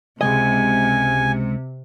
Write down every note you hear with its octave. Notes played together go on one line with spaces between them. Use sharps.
C#2 C3 G#3 D#5 G#5